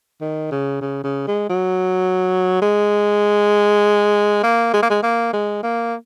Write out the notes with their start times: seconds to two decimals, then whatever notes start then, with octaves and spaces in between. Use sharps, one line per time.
0.21 D#3
0.51 C#3
0.81 C#3
1.04 C#3
1.28 G#3
1.49 F#3
2.62 G#3
4.43 A#3
4.74 G#3
4.83 A#3
4.90 G#3
5.03 A#3
5.33 G#3
5.63 A#3